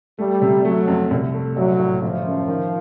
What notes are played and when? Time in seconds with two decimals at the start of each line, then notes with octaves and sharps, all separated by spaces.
0.18 G3 A3
0.42 C3
0.65 F#3 A3
0.88 F2
1.11 C2
1.34 A3
1.56 A#1 F#3
1.79 A2
2.02 G1 F3
2.25 F#2
2.48 D#3